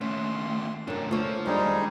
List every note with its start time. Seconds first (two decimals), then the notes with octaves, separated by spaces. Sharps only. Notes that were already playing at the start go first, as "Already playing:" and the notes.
0.01 D#2 A3 C#4 C6
0.88 F#2 C3 D4 A#4
1.11 D3 A3 F4 C5 C#5
1.46 F2 D#3 G3 G#3 D4 D#4